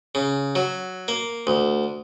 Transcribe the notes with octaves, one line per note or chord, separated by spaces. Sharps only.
C#3
F#3
A#3
D2